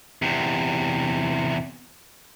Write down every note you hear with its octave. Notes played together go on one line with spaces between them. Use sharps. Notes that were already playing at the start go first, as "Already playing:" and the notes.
E2 C3